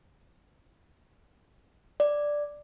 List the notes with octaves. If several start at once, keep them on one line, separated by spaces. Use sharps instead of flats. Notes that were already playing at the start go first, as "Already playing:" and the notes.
D5